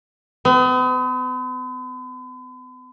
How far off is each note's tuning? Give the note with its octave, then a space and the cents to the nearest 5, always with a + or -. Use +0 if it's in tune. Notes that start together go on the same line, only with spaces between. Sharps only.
B3 +45